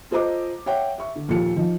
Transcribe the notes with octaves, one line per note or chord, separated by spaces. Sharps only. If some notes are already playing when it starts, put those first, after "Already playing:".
F4 A4 C5 D#5 A#5 D6
C#5 E5 F#5 G5
E5 C#6
D3
D#2 A#2 F3 A4 C#7
F3 D#4